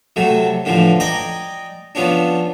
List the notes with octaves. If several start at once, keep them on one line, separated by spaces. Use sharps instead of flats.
C3 F#3 A3
A2 D3 E3 F3
D5 D#5 G5 G#5 A#5 D6
F3 B3 C#4 D4